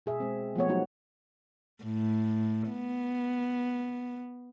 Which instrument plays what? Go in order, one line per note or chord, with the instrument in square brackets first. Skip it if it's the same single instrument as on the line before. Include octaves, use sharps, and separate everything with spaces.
[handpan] B2 G#4 E5
G#3 C4
F3 A3 B3 C#5
F#3 G3 B3 D#4 F#4
[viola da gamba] A2
B3